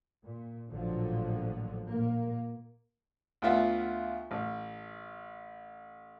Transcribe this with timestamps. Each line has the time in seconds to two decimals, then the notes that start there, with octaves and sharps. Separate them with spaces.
0.23 A#2
0.68 A1 A#2 D3 F3 F#3
1.87 A#2 A#3
3.42 D2 B3 F4 E5 F#5
4.31 A1